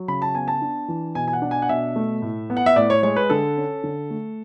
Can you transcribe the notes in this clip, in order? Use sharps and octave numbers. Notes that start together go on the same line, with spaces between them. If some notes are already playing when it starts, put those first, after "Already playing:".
Already playing: F#3
C#3 B5
A5
B3 G#5
A5
D4
E3
B2 G#5
G#5
F#5
D4
G#5
F#5
B2 E5
A3
A2
B3
F#5
E5
A2 D5
C#5
G#3 C#5
B4
D3 A4
C#4
D3
A3